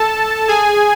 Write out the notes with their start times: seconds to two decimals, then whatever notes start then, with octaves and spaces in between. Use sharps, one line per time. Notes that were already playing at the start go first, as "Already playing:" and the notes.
Already playing: A4 A5
0.48 G#4 G#5